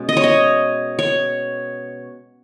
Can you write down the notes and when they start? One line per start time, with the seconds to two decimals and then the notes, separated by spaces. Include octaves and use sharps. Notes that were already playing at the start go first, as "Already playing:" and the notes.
Already playing: B2 G#3 C#4
0.09 D#5
0.17 C#5
0.24 D#5
0.99 C#5